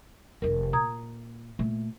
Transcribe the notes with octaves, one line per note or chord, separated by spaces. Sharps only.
F1 D#3 A#4
A#2 A#5 D#6 G#6
A#2 A3